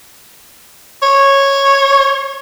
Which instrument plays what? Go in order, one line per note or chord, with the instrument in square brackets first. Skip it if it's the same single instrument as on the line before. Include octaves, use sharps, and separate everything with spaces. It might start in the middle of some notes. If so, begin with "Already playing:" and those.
[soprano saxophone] C#5